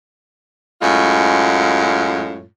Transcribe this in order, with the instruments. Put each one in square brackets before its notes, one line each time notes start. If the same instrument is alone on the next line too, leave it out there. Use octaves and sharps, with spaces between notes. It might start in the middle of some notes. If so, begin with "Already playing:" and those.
[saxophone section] F#2 A2 G#3 F4